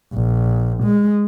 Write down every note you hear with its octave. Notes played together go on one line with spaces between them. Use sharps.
A#1
G#3